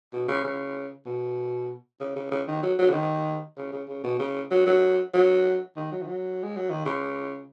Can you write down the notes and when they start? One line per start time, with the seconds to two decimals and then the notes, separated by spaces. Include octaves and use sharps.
0.13 B2
0.28 C#3
0.44 C#3
1.06 B2
2.00 C#3
2.16 C#3
2.31 C#3
2.47 D#3
2.63 F#3
2.79 F#3
2.90 C#3
2.94 D#3
3.57 C#3
3.72 C#3
3.88 C#3
4.04 B2
4.19 C#3
4.51 F#3
4.66 F#3
5.13 F#3
5.76 D#3
5.92 F#3
6.02 D#3
6.07 F#3
6.43 G#3
6.56 F#3
6.70 D#3
6.85 C#3